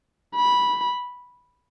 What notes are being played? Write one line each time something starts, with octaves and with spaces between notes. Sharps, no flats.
B5